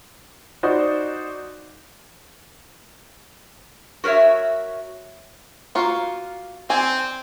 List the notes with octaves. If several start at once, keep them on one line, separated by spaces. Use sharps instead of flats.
D#4 F#4 C5 D5
F#4 A#4 B4 C#5 E5
A#3 F4 F#4
C4 C5 D5 G#5